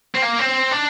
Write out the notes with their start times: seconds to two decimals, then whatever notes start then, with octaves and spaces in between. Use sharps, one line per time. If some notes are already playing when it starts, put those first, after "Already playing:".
0.14 C4
0.22 A#3
0.39 C4
0.71 D4